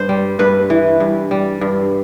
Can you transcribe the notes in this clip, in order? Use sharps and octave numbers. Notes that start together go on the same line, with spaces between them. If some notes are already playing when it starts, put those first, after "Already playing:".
Already playing: G2 C5
G3
G2 B4
E3
G2
G3
G2